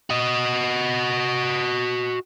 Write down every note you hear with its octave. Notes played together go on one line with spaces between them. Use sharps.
F#4 D#5